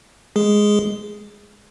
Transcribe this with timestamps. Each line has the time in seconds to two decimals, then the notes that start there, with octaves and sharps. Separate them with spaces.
0.36 G#3 G#4